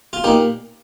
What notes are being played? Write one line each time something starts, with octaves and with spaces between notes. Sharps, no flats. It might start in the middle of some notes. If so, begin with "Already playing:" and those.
F4
A#2 D#4 G4